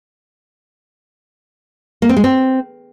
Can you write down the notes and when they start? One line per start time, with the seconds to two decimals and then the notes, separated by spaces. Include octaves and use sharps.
2.02 A#3
2.09 C4
2.17 G#3
2.24 C4